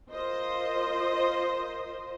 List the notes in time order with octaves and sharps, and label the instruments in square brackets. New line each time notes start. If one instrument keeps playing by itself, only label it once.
[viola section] F4 A#4 C5 D#5